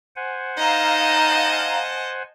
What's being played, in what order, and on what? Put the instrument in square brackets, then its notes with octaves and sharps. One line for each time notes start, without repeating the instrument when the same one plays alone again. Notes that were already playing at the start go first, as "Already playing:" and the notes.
[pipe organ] C5 F#5 G#5
[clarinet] D#4 [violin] D#5 A5 [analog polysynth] F5 A#5